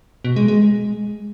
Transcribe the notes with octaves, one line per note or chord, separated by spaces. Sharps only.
B2
G#3
G#3